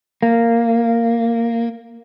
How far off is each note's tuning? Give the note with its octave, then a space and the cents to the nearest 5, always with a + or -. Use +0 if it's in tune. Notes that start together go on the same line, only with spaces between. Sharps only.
A#3 -10